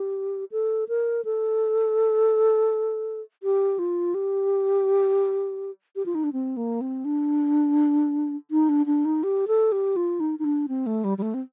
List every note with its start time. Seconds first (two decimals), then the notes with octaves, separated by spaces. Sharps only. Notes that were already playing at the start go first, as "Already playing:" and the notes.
Already playing: G4
0.52 A4
0.89 A#4
1.25 A4
3.43 G4
3.79 F4
4.14 G4
5.96 G4
6.06 F4
6.15 D#4
6.24 D4
6.33 C4
6.57 A#3
6.81 C4
7.05 D4
8.51 D#4
8.69 D4
8.86 D4
9.05 D#4
9.23 G4
9.48 A4
9.72 G4
9.96 F4
10.20 D#4
10.39 D#4
10.44 D4
10.68 C4
10.86 A3
11.04 G3
11.18 G3
11.22 A3
11.34 C4